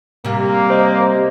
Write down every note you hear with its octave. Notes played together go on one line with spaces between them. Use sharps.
C3 G3 A#3
C5 D#5